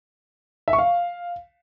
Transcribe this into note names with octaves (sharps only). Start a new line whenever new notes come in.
E5
C#6
F5